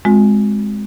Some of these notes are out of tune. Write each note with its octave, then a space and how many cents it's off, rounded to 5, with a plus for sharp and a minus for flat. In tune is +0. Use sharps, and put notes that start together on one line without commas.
G#3 +0 C4 +0 F#4 -45